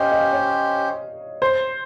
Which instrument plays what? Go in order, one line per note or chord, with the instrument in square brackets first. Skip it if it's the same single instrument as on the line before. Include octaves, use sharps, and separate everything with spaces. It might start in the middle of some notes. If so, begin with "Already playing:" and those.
Already playing: [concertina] C#4 G4 C5 [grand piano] D#5 F5
[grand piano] D#5
C#5
C5